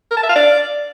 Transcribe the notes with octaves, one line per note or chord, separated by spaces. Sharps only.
A#4
A5
E5
F5
D5